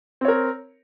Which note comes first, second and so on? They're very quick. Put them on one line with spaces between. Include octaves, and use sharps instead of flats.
C4 C#5 A#4